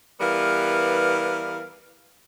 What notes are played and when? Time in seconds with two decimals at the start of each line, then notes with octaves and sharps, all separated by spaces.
0.20 E3 G3 B3 A#4 F5